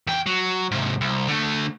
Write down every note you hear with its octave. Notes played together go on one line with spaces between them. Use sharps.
E2 G5
F#3
G#2 C3
C2
D3 A3